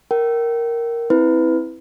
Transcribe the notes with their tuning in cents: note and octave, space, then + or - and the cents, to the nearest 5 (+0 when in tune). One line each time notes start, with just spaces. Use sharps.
A#4 +0 G5 -35
C4 +5 E4 -15 B4 +15